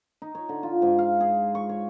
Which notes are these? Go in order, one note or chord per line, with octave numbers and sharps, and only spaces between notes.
D#4
C#5
D3
F4
G#2
F5
G#4
C#6
C#5